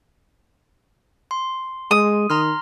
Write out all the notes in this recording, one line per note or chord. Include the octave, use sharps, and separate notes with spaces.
C6
G#3 D#6
D#3 A#5 C6 F6